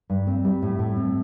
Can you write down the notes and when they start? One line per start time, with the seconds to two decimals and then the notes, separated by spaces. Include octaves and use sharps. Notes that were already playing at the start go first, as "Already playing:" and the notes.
0.10 G2
0.27 C4
0.44 G3
0.62 A2
0.79 A2
0.96 C4